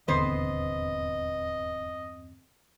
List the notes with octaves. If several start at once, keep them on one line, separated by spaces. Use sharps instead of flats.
D#1 E2 G2 D3 B3 C4 C5 D#5